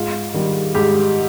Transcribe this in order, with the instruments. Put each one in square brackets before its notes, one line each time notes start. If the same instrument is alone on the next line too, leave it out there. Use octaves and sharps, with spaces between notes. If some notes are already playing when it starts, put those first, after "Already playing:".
Already playing: [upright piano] G#2 F4
D#3 G3
G#2 G4